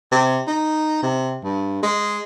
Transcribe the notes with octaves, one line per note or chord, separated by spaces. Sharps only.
C3
D#4
C3
G2
G#3